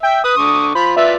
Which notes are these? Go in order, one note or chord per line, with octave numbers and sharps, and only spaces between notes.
E5 G5
B4 D#6
D3 C#6 D6
F4 C5 B5
F4 B4 D5 E5